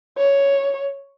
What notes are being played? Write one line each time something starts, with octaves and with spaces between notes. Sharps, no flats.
C#5